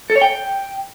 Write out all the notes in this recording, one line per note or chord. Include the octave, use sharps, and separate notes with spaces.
A4
C#5
G5